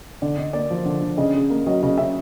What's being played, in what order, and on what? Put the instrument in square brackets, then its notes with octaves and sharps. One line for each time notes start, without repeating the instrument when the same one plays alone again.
[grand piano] D3 D5
D3 D#5
A#3 D5
F3
D3
D3
C#3 D#5
C#3
A#3
F#3 D#5
C#3 D#5
C#3 E5